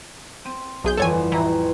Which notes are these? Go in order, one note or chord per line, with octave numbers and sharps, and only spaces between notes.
C4 D#7
B1 G#4 G6
G1 F2 E3 A4 C#5 G#5
A1 E3 A#5